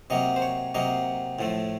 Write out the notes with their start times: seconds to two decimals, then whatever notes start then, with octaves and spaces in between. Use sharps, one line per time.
0.10 C3 F#3 A#3 D#5
0.36 C5
0.42 C#5
0.74 C3 F#3 A#3 D#5
1.39 A2 F3 A3